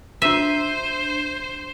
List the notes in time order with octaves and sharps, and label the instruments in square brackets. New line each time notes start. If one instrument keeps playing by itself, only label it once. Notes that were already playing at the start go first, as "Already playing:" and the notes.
[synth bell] D4 D#7 [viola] C5 [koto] E5